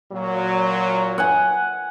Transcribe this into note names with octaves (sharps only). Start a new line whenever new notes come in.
A#2 F#3
F#5 G#5